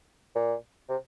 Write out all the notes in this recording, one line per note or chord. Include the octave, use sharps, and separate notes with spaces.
A#2
C3